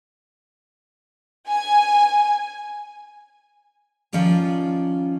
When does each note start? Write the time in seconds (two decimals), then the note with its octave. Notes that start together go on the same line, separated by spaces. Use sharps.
1.47 G#5
4.13 D#3 F3 C#4 F4 D5 A#5